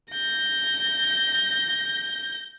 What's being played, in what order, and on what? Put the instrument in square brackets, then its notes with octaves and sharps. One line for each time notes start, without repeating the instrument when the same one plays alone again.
[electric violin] G6 A#6